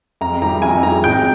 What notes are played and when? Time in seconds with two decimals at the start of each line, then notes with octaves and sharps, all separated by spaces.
0.21 F2 A#5
0.42 D#3 G3 A#5
0.62 F2 G#5
0.83 D#3 G3 A#5
1.04 G#1 G5